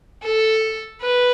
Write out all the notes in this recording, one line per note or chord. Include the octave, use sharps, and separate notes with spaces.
A4
B4